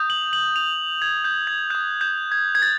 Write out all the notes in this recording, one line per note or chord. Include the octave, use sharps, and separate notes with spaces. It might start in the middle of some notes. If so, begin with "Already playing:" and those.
Already playing: D#6 G6
F#7
F#7
F7
G#6
G6
G#6
D#6 F#6 G6
G6
G#6
G#6
A6